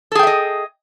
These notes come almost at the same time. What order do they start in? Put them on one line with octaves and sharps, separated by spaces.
A4 G#4 G5 E5 D#5